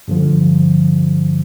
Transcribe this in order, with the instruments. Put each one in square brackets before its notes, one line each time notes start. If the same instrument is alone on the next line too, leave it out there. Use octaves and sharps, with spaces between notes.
[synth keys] G2 D3 F3